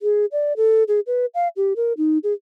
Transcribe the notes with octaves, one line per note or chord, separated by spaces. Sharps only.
G#4
D5
A4
G#4
B4
F5
G4
A#4
D#4
G#4